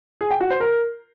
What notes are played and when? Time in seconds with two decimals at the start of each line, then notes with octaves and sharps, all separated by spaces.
0.21 G#4
0.31 G5
0.40 F#4
0.50 C5
0.60 A#4